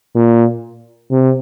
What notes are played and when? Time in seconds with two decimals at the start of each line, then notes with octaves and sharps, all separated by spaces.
0.16 A#2
1.12 C3